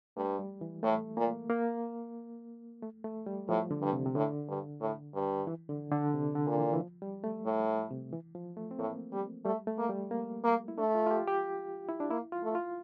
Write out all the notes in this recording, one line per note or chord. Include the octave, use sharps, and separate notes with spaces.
G2 A3
G3
E3
A2 A3
A#2 A#3
A#3
A3
A3
G3
A2 F3
D3
G2
C3
C3
A2 D3
G2
A2
G2
E3
D3
D3
C3
D3
A#2
E3
E3
F3
G3
A3
A2
C3
E3
F3
A3
C4
A2 A#3
G3
G3 A3
A3
A#3
G3
A#3
A#3
E4
A3 D4
F4
F4
G4
G4
E4
D4
A#3 E4
F4
A3
F4